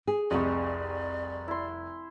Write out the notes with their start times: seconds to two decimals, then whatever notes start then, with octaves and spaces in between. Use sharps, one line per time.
0.07 G#4
0.31 F1 C2 D5 D#5 G#5 C#6
1.48 E4 C6